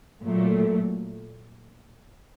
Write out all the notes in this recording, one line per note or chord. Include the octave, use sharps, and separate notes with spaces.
A#2 F#3 A3